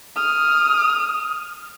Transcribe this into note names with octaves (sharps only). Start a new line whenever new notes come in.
D#6 F6